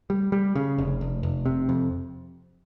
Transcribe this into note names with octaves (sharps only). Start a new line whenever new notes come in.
G3
G3
C#3
F1
F1
F1
C3
F2